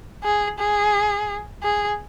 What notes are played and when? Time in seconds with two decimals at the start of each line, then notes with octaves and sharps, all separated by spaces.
0.24 G#4
0.59 G#4
1.63 G#4